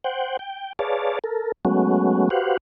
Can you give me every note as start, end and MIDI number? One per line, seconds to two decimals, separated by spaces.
0.04 0.37 72
0.04 0.37 78
0.04 0.37 79
0.39 0.73 79
0.79 1.19 68
0.79 1.19 71
0.79 1.19 73
0.79 1.19 74
0.79 1.19 77
0.79 1.19 81
1.24 1.52 69
1.24 1.52 70
1.65 2.29 54
1.65 2.29 56
1.65 2.29 57
1.65 2.29 59
1.65 2.29 61
1.65 2.29 66
2.30 2.57 66
2.30 2.57 67
2.30 2.57 71
2.30 2.57 72
2.30 2.57 77
2.30 2.57 78